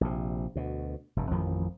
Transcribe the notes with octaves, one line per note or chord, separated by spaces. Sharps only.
A#1 C3
D2 B2
F1 G2
A1 F2 D#3 F3